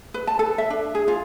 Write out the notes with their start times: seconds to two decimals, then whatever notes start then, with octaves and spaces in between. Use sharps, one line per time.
0.14 B4
0.27 A5
0.39 A4
0.58 E5
0.70 D4
0.95 G#4
1.08 F4